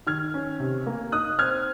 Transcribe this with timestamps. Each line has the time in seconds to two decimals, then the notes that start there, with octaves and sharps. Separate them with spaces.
0.07 D#3 F6 G#6
0.34 C#4
0.60 C3
0.86 A#3
1.12 D#4 D#6 F#6
1.39 C4 F6 G#6